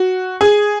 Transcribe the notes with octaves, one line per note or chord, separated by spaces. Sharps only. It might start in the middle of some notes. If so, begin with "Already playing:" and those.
Already playing: F#4
G#4